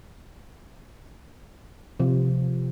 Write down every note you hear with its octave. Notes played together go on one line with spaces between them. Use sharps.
C3 F3